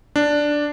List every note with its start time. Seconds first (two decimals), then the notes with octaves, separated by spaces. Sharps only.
0.16 D4